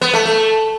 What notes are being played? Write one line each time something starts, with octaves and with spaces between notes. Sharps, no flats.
B3
A3
A3